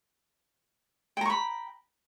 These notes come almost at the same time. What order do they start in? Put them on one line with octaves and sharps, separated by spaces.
G5 A#5 C#6 B5